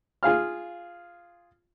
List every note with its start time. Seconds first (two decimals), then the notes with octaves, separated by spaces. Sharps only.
0.23 F4 G#4 F5 F6